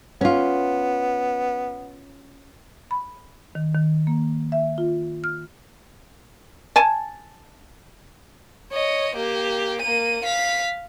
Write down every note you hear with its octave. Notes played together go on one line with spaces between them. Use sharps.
B3 C#4 F4
B5
D#3
D#3
A#3
E5
F4
F6
G#5 A5
C#5 D#5
A#3 G4
A#3 D#7
F5 B6